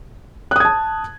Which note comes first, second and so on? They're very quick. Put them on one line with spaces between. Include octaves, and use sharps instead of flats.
F#6 D#6 G#6 A5